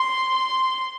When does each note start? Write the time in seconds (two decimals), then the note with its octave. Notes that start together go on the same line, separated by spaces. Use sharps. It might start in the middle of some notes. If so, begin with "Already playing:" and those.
Already playing: C6
0.35 C6